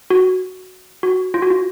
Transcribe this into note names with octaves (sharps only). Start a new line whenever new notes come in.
F#4
F#4
F4
F#4
F4